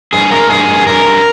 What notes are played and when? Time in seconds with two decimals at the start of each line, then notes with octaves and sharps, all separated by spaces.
0.13 G2 G#4
0.31 G#3 A#4
0.49 G2 G#4
0.69 G2
0.86 G2 A#4
1.05 G2